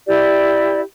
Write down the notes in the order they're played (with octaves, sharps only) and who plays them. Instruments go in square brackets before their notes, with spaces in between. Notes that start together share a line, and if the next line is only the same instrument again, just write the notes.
[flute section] E4 G4 D5